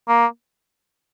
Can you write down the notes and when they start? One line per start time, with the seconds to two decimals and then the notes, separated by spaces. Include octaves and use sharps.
0.08 A#3